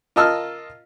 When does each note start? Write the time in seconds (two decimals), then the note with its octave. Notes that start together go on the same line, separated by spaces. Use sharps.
0.16 F4 A#4 D#5 A5 E6 F6